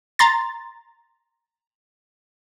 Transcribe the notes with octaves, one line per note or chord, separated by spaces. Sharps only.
A#5 C6 A6